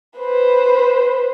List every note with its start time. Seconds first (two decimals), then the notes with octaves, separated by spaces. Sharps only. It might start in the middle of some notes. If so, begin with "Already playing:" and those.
0.18 B4 C5